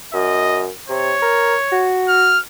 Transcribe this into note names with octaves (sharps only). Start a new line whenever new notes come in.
F#2 D#5
C3 C#5
A#4
F#4
F6